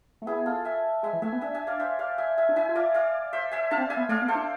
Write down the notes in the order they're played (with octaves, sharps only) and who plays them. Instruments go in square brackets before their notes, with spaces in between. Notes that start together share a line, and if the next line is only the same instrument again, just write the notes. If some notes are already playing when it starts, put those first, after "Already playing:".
[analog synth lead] A3
[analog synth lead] B3 [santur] E4 G#4
[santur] F4 A4
E5 G#5
[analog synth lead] G#3 [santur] E5 G#5
[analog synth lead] E3
[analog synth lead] A3 [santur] E5 G#5
[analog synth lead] B3
[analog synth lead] D4 [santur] E5 G#5
[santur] E5 G#5
D5 F5
C5 E5
D5 F5
E5 G#5
E5 G#5
[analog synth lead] D4
[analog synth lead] E4 [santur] E5 G#5
[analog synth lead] F4
[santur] D5 F5
D5 F5
C5 E5
E5 G#5
[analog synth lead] D4 [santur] F5 A5
[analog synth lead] C4
D4
[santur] E5 G#5
[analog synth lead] B3
[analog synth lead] A3 [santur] D5 F5
[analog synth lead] B3
[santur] A4 C5
[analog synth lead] D4